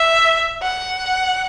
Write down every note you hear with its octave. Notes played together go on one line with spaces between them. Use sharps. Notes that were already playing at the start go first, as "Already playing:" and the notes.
Already playing: E5
F#5